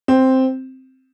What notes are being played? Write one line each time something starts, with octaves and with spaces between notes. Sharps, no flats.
C4